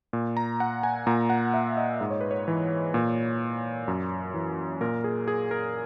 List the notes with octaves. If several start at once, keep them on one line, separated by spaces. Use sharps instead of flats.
A#2
A#5
F#5
G#5
A#2 A#5
F#5
E5
D#5
G#2 D#5
C#5
B4
C#5
E3
A#2
F#2
E3
A#2 A#4
G#4
G#4
A#4